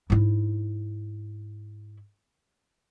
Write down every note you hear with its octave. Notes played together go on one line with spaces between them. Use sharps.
G#2 E4